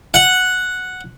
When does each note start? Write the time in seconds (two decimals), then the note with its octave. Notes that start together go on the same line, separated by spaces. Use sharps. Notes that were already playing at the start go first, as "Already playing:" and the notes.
0.14 F#5